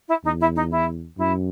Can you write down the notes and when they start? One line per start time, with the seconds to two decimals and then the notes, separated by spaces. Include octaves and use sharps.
0.08 E4
0.24 E2 D#4
0.41 E4
0.56 D#4
0.71 E4
1.18 F#2 E4